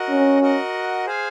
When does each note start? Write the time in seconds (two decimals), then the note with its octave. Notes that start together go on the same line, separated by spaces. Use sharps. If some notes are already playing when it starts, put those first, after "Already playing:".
Already playing: F#4 A#4 D#5 F#5
0.09 C#4
0.41 F#4 A#4 D#5 F#5
1.06 G#4 C5 F5 G#5